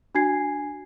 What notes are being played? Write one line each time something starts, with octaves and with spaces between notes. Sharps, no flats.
D4 F#4 G#5 G#6 C7